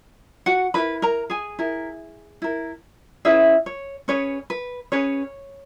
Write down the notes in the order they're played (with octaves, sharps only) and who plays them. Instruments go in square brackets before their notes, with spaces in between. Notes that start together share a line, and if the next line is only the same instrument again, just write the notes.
[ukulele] F#4 F#5
E4 A#4 B4 B5
A#4 A#5
G#4 G#5
E4 A#4
E4 A#4
C#4 E4 G#4 B4 E5
C#5
C#4 G#4 B4 C#5
B4
C#4 G#4 B4 C#5